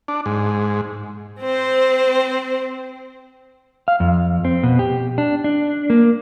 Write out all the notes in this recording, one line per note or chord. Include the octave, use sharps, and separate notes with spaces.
D4
G#2
C4 C5
F5
F2
C4
B2
G4
D4
D4
A#3